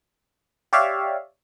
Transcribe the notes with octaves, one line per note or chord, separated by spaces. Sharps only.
G4 C#5 D5 E5 F5